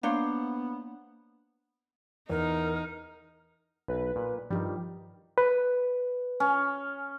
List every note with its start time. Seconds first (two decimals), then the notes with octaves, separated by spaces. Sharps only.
0.03 A#3 B3 D4 C5 C#5 F5
2.30 E2 D#4 A#4
3.88 B1 B4
4.16 A#2
4.51 G2 D#3 F3 G3 G4
5.38 B4
6.40 C#4